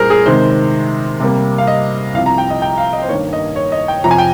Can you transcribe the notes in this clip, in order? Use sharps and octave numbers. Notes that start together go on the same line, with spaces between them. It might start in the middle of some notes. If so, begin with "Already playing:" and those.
Already playing: A#2 G3 C#4 F4 G#4 A#4 C5
G#4
C3 D#3 G#3 C5
C3 G3 A#3
F5
D#5
C2 C3 F3 F5
A#5
G5
D#5
G5
F5
D#5
C5
G2 D#3 A#3 C#5
D#5
C#5
D#5
G5
F2 C3 F3 A#5
G#5
G5